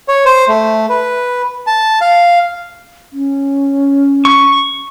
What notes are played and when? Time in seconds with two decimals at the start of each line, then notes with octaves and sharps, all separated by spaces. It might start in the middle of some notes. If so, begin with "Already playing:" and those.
0.08 C#5
0.26 C5
0.48 A3
0.89 B4
1.67 A5
2.01 F5
3.13 C#4
4.25 C#6